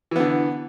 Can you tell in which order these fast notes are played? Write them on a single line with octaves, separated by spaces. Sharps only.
E3 B3 D3